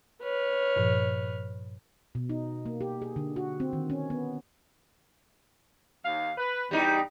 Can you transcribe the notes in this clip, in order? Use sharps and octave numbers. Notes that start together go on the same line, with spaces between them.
B4 C#5 F6
G2 A#2 F3
B2
D#4
A#3
G4
G#4
D3
F#4
C4
D#3
C#4
B3
D#2 F5
B4
E2 G3 D#4